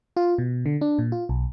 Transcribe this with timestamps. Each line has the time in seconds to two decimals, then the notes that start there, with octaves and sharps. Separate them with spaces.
0.17 F4
0.38 B2
0.66 D3
0.81 D4
0.99 A#2
1.12 F4
1.29 B1